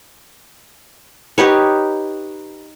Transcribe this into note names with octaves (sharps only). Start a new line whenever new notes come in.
D#4 G4 B4 C#5